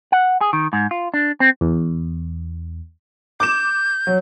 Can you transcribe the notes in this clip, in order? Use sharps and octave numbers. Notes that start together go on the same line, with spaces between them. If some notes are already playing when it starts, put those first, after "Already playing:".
F#5
G#4
D#3
G#2
F4
D4
C4
E2
D6 G6 E7
F#3